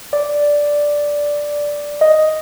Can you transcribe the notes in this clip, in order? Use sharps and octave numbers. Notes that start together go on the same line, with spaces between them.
D5
D#5